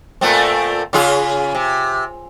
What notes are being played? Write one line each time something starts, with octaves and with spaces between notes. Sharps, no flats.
A#2 A3 C4
C#3 F4 G#4
C3